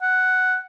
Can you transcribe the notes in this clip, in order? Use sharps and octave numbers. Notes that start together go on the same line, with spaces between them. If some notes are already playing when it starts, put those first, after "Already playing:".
F#5